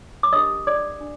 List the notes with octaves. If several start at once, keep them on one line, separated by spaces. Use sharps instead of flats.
D6
D4 G4 A#4 D#5 D#6
D5 D6
D4